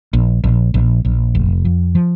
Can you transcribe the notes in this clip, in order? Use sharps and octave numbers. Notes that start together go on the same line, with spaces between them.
A#1
A#1
A#1
A#1
F1
F2
F3